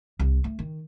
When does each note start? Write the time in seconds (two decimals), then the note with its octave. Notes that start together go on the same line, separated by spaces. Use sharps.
0.19 C2
0.44 A3
0.59 D#3